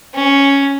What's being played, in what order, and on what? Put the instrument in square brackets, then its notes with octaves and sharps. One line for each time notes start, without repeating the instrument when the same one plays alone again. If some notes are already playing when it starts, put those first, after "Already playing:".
[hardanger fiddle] C#4